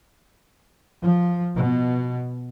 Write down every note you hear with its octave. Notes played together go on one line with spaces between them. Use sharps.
F3
B2